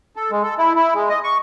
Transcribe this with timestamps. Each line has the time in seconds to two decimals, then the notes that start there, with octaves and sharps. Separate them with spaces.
0.16 A4
0.31 G#3
0.43 A4
0.58 E4
0.75 E4
0.94 G#3
1.09 D#5
1.24 C#6